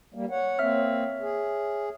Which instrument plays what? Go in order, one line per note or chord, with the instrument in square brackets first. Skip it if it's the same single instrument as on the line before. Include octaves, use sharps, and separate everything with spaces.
[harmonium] G3 A#3
C#5 F#5
[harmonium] A#3 C4 [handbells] C#5 E5 F6
[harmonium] G#4